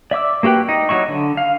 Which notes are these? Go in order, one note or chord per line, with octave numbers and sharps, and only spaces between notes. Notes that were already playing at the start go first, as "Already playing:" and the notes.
D5 E5 D6 E6
A#3 F#4 G4 B4 G5
D#4
F#3 D#4 E4 C#6
D3
F5